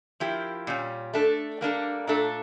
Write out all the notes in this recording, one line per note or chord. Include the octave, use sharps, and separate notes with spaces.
F3 A#3 E4 G4
A#2 G3 C#4
A3 D4 A4
G3 A#3 D4 A4
A#2 A3 D4 A4